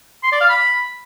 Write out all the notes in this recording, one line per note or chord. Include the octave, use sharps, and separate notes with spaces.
C6
D5
F5
B5